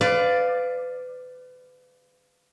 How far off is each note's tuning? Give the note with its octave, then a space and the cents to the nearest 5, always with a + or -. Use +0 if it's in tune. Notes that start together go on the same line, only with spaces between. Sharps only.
B4 +35 D5 +0 F5 +0